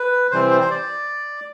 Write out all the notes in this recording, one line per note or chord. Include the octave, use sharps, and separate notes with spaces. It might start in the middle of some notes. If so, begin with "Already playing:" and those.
Already playing: B4
C3 E3 G3 C4 C5
C5
C5
D5